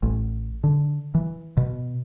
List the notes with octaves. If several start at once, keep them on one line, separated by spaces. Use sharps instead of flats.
A1
D3
E3
B2